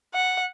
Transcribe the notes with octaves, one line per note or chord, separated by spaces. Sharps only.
F#5